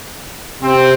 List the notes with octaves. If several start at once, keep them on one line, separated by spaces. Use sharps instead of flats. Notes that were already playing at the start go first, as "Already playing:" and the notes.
C3 C4